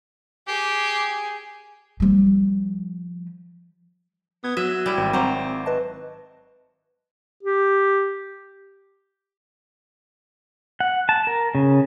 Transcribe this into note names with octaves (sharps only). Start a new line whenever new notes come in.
G4 G#4
F3 G3
B3 D#6 G#6
F#3 E5 D#7
G3 E4
G#1
F#3 C4 C5 F#5 A#5 D6
B4 D#5 A5
G4
F#5
A5
A#4
C#3